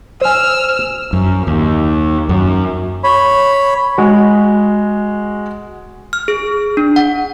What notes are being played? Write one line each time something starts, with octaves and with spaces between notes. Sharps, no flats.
C5 G#5 E6 F6
F#2
D#2
F#2
C#5 B5
G#3 F#4
F6
G#4
D4
F#5